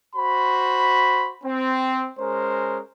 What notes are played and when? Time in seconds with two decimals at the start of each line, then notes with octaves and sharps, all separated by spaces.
0.16 F#4 C5 B5
1.44 C4
2.19 G#3 C#4 A#4 C5